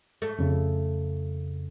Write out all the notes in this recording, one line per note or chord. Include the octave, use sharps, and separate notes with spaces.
A3
F2 C#3